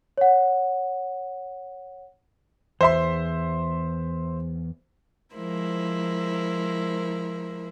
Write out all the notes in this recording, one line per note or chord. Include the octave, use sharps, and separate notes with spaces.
C#5 F#5
E2 C5 E5 C6
F3 G#3 E4 A#4 C5